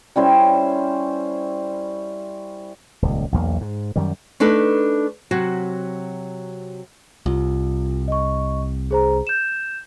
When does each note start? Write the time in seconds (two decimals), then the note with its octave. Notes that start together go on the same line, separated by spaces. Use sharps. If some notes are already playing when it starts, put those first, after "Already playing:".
0.16 G3 C#4 E4 C5
3.02 D#1 C#2
3.32 B1 E2 A#3
3.61 G#2
3.96 F#2 D#3 G3
4.40 A3 D4 D#4 A4 B4
5.31 C3 F#3 F#4
7.26 C2 F4
8.08 D#5 C#6
8.91 G#4 C5 A#5
9.27 G6 E7